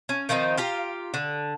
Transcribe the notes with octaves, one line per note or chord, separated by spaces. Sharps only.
C#4
D#3 F3 C4 D#4
F4 G4 A#5
D3